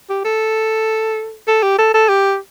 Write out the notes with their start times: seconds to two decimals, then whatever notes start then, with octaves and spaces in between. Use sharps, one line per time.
0.10 G4
0.25 A4
1.48 A4
1.63 G4
1.78 A4
1.94 A4
2.09 G4